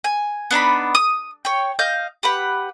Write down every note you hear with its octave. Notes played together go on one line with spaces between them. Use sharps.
G#5
B3 D4 D#4 B5
D#6
C#5 G5
D#5 F5 G6
G4 B4 F#5